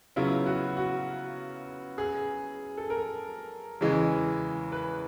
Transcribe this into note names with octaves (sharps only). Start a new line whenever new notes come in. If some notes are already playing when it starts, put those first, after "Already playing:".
C#3 F#3 B3 E4 F4
F#4
F#4
G#4
A4
A#4
E2 C#3 E3 G#3
B4